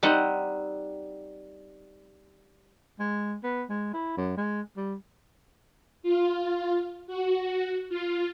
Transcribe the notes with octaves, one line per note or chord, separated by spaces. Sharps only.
G3 C4 D#4 F#5
G#3
B3
G#3
E4
F#2
G#3
G3
F4
F#4
F4